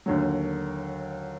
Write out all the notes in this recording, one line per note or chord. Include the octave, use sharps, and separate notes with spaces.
D#2 D3 F#3